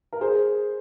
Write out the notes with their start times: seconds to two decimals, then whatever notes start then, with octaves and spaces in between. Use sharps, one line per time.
0.13 A#4
0.21 G#4 C5